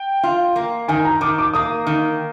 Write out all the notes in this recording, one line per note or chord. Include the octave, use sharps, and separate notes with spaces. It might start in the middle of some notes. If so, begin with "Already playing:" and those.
Already playing: G5
F4
A#3
D#3 G#5
A#5
D#3 D6
D6
A#3 D#6
D#3